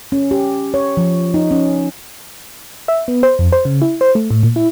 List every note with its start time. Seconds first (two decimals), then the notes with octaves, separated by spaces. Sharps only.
0.12 C#4
0.31 G4
0.74 C#5
0.97 F3
1.34 D#4
1.51 C#4
2.88 E5
3.08 B3
3.23 C5
3.39 F2
3.52 C5
3.65 C#3
3.82 E4
4.01 C5
4.15 A3
4.31 A2
4.43 A#2
4.56 E4